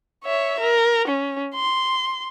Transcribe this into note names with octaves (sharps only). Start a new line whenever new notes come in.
C#5 E5
A#4
C#4
C6